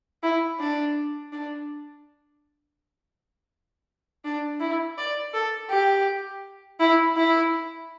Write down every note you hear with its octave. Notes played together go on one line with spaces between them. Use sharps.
E4
D4
D4
D4
E4
D5
A4
G4
E4
E4